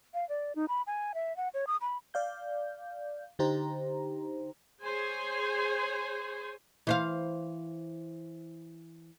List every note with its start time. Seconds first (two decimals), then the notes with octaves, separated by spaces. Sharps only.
0.14 F5
0.29 D5
0.56 D#4
0.68 B5
0.87 G#5
1.15 E5
1.37 F#5
1.54 C#5
1.67 D#6
1.81 B5
2.14 D5 F5 G6
3.39 D3 D#4 G4 C5 A#5
4.82 G#4 C5 C#5 G#5
6.87 E3 C5 F5